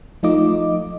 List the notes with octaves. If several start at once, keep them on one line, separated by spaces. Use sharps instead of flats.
F3 A3 D#4 F4 D#5 D6